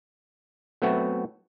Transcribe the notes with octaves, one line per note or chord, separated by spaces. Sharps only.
F#3 A3 B3 C4 F#4 E5